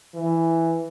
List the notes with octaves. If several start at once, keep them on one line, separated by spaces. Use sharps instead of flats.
E3